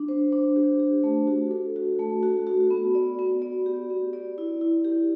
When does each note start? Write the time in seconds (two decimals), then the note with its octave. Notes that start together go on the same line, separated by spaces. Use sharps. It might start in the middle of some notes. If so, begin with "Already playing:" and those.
Already playing: D4
0.09 C5
0.32 D4
0.56 G4
0.80 G4
1.04 A3
1.27 F#4
1.51 A4
1.76 F#4
1.99 A3
2.23 F#4
2.47 F#4
2.71 B3
2.95 D5
3.19 B3
3.42 D5
3.66 G4
3.90 B3
4.13 D5
4.38 E4
4.61 E4
4.84 G4